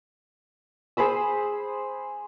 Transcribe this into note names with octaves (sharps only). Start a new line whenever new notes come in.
G#4 C5 B5 E6